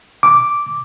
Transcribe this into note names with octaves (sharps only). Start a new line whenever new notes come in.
D6